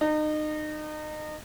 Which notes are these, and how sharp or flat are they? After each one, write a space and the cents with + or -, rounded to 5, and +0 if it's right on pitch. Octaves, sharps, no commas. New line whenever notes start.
D#4 -30